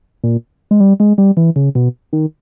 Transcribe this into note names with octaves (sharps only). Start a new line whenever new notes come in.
A#2
G#3
G3
G#3
G3
E3
C#3
B2
D#3